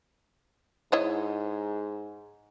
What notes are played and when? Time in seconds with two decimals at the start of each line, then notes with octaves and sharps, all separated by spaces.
0.92 G#2 E4 C#5 D#5